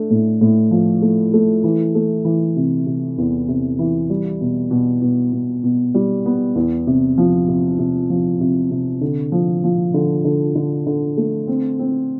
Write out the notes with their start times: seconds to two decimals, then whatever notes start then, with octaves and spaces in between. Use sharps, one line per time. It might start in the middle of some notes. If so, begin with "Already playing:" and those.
Already playing: A3 D4
0.10 A2
0.41 A2
0.71 F3
1.02 A3
1.33 A3
1.64 E3
1.95 A3
2.25 E3
2.57 C3
2.86 C3
3.18 E2
3.48 C3
3.79 E3
4.10 G3
4.41 B2
4.71 B2
5.02 B2
5.33 B2
5.64 B2
5.94 G3
6.26 B3
6.56 E2
6.87 C3
7.18 F3
7.48 C3
7.79 C3
8.10 F3
8.40 C3
8.71 C3
9.01 D3
9.32 F3
9.64 F3
9.94 D3
10.25 D3
10.55 D3
10.87 D3
11.17 A3
11.47 C4
11.79 C4